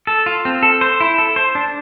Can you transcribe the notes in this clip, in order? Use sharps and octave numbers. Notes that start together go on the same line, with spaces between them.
A4
F4
C4
A4
C5
E4
A4
C5
D4